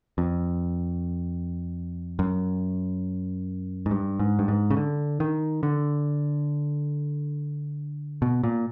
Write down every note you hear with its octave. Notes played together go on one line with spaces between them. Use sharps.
F2
F#2
G#2
G2
G#2
G2
G#2
C#3
D3
D#3
D3
B2
A#2